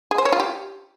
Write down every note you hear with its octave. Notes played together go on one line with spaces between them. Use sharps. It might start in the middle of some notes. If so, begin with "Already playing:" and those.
G#4
C5
C#5
F4
G4